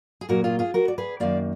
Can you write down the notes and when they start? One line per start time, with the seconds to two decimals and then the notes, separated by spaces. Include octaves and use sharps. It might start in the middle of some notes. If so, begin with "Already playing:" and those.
0.21 G#4
0.29 A#2 F#3 A#3 F#4 A#4
0.44 F4 G#4
0.59 F4 G#4
0.74 F#4 A#4
0.88 D5
0.98 G#4 B4
1.20 F#2 D#3 A#3 D5 F5